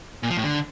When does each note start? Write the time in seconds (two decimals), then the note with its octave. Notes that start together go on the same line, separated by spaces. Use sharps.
0.23 A#2
0.30 F3
0.37 A2
0.44 D3